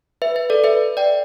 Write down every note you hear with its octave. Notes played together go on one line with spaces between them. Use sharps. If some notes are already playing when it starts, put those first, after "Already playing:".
B4 E5
B4 E5
A4 D5
B4 E5
D5 G5